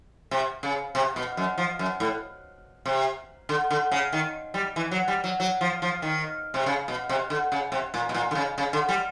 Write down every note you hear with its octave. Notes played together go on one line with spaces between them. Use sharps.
C3
C#3
C3
B2
F#2
F3
F#2
A2
C3
D3
D3
C#3
D#3
G3
E3
F#3
G3
F#3
F#3
F3
F3
D#3
C3
C#3
B2
C3
D3
C#3
C3
A#2
B2
A#2
D3
C#3
C#3
D3
G3